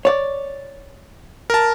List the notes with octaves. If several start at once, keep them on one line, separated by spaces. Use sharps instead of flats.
C#5 D5
A#4 A5